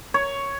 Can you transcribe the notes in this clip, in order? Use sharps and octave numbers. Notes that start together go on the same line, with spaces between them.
C#5